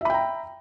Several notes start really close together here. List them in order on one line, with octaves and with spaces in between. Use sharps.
E5 B5 G5 A#5